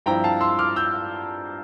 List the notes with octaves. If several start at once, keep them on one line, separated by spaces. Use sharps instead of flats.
G2 F3 C4 E4 G5 A#5
F5 A5
C6 E6
D6 F6
E6 G6